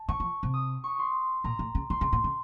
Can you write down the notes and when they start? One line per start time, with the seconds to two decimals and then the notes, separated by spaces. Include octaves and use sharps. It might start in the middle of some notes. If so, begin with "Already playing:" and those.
Already playing: A5
0.08 D#3 C#6
0.20 F3
0.43 C3
0.54 D#6
0.84 C#6
0.99 C6
1.44 A#2 A#5
1.59 A2
1.75 C#3
1.90 D#3 C6
2.01 C#3
2.12 A#2
2.24 C#3